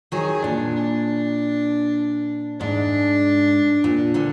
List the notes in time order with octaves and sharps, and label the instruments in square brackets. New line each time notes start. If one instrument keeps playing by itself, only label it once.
[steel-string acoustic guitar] D#3 F#3 [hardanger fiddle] G#4
[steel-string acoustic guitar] A#2 [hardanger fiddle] D4
[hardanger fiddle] D4
[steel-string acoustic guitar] G#2 [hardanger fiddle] D4
[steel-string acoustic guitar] A#2
A#2 D3